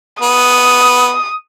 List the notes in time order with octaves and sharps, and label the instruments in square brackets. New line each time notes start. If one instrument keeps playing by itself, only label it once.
[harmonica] B3 [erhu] D#6